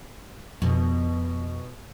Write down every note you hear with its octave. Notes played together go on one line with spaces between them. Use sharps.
F2 B2